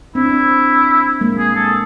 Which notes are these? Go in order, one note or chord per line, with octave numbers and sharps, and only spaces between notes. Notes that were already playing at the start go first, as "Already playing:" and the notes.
C4 D4 E4
G#3 A#3
G#4
A4